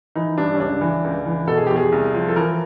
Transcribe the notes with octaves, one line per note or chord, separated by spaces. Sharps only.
E3 D#4
G2 D4
C#4
C#2 D4
E3
C#2
E3
B2 A4
G#4
E2 G4
G#4
C2
F3
A4
E3 A#4